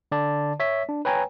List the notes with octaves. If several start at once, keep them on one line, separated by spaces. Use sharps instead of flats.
D3 D5 A5
C#5 E5 B6
D4
B4 C#5 G5 G#5 A#5